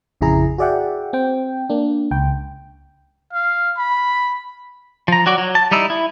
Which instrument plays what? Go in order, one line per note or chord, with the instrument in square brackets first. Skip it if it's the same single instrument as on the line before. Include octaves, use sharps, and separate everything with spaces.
[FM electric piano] A1 F2 C#3 E4 G#4 A#5
F#4 G#4 D5 E5 F#5 G5
C4 G5
A#3 D4
C#2 G5
[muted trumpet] F5
B5
[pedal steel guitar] F3 A#5
F#3 F#4 D5
F#3
A5
G3 D#4 E4 E6
E4